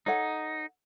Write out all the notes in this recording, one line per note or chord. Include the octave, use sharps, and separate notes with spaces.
D#4 A4 C#5 F#5